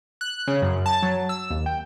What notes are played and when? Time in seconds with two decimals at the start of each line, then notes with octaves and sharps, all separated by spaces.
0.21 F#6
0.47 C#3
0.62 F#2
0.86 A5
1.03 F#3
1.29 E6
1.50 D#2
1.66 G5